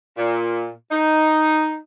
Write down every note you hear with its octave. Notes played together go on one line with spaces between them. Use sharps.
A#2
D#4